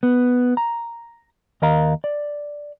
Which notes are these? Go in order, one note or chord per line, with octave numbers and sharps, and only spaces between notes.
B3
A#5
D#2 A#4 D#5 F5 A#5
D5